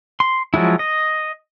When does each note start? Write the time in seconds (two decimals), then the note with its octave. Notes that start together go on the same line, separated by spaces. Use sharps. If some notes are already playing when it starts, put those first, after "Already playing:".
0.20 C6
0.54 F3 F#3 G#3 E4
0.79 D#5